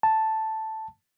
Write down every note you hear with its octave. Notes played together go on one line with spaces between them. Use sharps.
A5